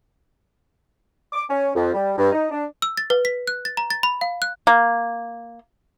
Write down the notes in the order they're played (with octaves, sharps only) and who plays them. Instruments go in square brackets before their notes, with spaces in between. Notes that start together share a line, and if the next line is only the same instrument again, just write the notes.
[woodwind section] D6
C#4
F2
G3
G2
D#4
D4
[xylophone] E6
A6
B4
B6
F#6
A6
A#5
A6
B5
F5
F#6
[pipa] A#3